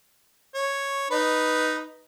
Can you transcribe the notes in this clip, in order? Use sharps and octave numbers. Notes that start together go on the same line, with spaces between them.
C#5
D#4 B4